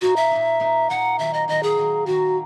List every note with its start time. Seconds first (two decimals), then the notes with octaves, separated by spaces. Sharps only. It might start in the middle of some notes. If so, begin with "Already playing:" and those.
0.02 A#2 A#3 D#4 F#4
0.16 E5
0.31 A#2 A#3 D#4
0.60 A#2 A#3 D#4
0.90 A#2 A#3 D#4 F#5
1.19 D#3 F#3 A#3 E5
1.33 D#5
1.48 D#3 F#3 A#3 D#5
1.63 G#4
1.77 D#3 F#3 A#3
2.06 D#3 F#3 A#3 F#4